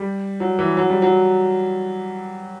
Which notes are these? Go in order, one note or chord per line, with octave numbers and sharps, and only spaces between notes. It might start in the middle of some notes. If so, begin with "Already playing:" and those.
Already playing: G3
F#3
E3
F#3
G3
F#3